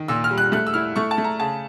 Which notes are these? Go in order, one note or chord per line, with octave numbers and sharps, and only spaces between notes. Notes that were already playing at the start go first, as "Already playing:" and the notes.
Already playing: D#3
A#2 E6
F6
G3
F#6
A3 F#6
E6
E4 F6
A3 C#6
A5
A3
A#5
C#3 A5